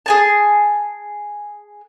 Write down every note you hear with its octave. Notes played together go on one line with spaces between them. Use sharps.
G#4 G#5 A5